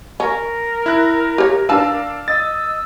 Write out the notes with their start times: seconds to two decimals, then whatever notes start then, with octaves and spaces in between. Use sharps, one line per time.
0.20 C#4 A#4
0.86 E4 F#6
1.38 G4 C#5
1.69 D4 B4 F5 A5 E6
2.28 D#5 E6 A6